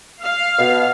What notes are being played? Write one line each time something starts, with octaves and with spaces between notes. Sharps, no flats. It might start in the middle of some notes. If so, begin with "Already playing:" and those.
F5
B2